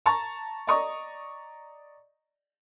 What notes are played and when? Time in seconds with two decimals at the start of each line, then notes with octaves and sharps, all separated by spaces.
0.06 A5 A#5 C#6 A6
0.67 D5 D#5 A#5 C#6 D#6